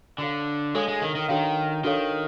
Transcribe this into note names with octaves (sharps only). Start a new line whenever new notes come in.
D3 D4 F#4 A4 C#5 F5
G#3 D4 F#4 A4 C#5 F5
G#3
D#3
D#3
D#3 D4 F#4 A4 C#5 F5
D#3 D4 F#4 A4 C#5 F5